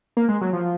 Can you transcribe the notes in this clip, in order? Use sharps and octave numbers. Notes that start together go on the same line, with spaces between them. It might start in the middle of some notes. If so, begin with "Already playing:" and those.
A#3
G#3
F#3
F3